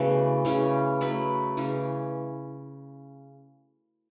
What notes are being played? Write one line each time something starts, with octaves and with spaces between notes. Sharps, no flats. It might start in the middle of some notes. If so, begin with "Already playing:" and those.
Already playing: C#3 E3 A3 B3 F#4
C#3 E3 C#4
F#3 A3 E4 B4
C#3 E3 C#4